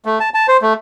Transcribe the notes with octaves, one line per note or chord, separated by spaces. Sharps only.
A3
A5
A5
C5
A3